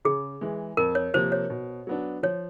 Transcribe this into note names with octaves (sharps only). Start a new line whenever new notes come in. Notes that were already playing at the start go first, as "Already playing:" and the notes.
C#3 G#4
E3 G#3
F2 A#4
C#5
C3 F3 A#3 C5
C#5
B2
F#3 B3 D4
F3 C#5